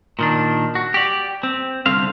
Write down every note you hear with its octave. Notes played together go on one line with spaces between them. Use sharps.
A#2 D#3 D4
F#4
G4 D5
C4
C2 D3 C4 F5